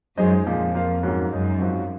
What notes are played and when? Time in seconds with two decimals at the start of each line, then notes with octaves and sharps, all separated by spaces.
0.17 F#2 G#3 D#4 G#4 C5 D#5
0.46 F2 A#2 F3 G#3
0.75 A#3 F4 C5 F5
1.03 G#2 F#3 A#3 C#4 F4
1.30 F#2 G#3 D#4 G#4
1.59 G#2 F3 C4 F#4